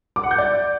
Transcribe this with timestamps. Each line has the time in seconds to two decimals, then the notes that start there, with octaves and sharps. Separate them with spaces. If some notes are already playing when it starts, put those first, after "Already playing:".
0.16 D6
0.24 F#5
0.31 G6
0.38 D5